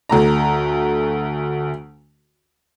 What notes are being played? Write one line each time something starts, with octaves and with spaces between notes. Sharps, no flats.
D2 A3 A#5